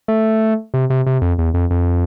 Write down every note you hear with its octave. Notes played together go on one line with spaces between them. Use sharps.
A3
C3
C3
C3
F2
E2
F2
F2